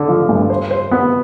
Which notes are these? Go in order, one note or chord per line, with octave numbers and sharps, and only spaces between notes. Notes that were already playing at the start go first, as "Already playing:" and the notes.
Already playing: D3
F3
G2
C5
C5
B3